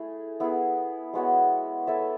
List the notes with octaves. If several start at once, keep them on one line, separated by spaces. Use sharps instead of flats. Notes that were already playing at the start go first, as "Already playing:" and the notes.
Already playing: A3 E4 G#4
B3 E4 G#4
G#3 B3 F#4 C#5
E4 A4 C#5 E5